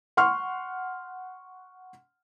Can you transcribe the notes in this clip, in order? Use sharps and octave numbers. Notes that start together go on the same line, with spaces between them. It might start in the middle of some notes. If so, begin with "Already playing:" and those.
F#5 C6 C#6 F6